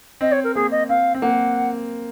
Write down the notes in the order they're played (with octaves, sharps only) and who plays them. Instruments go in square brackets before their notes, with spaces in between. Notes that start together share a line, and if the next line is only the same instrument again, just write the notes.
[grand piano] C4 [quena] D#5
[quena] C#5
A#4
[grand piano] A#3 [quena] G#4
[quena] D#5
[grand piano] C4 [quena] F5
[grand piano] C4
[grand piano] A#3 [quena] F#5